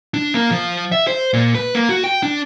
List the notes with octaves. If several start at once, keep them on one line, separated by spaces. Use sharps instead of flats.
D4
A#3
F3
E5
C5
A#2
B4
A#3
F#4
G5
D4